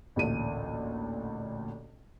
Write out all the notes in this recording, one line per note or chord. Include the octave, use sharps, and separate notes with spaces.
A1 D2 A#2 D#7